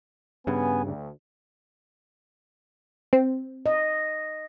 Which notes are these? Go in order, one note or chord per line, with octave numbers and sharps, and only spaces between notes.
G2 C#3 B3 G#5
D2
C4
D#5